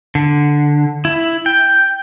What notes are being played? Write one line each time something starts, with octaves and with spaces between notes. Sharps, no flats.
D3
E4
G5